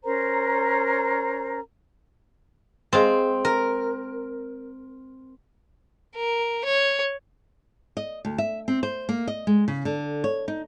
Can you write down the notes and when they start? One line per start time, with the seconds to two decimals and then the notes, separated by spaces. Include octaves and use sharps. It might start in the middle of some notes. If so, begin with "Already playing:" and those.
0.04 C#4 A#4 C5 A#5
2.93 G#3 C4 F5 A5
3.45 A#4
6.17 A#4
6.66 C#5
7.97 D#5
8.25 D2
8.38 E5
8.68 C4
8.83 C5
9.09 A#3
9.27 D#5
9.47 G#3
9.68 C#3
9.85 D3
10.24 C#5
10.48 D#4